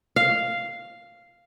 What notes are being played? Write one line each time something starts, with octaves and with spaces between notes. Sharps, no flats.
F5